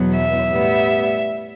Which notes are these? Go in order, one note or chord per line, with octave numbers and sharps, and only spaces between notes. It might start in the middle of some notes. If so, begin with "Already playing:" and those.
Already playing: E2 B2 F#3 B3
E5
A2 G3 B3